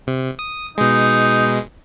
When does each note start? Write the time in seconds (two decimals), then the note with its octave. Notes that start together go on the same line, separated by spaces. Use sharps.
0.07 C3
0.39 D#6
0.78 B2 G#3 D#4